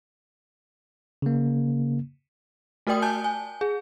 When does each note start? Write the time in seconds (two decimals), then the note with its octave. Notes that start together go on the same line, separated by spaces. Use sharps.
1.22 C#3 A#3
2.87 A3 F#4 A#4 D5 G5 D#6
3.02 G#5 A5 G6
3.24 G#5
3.61 G#4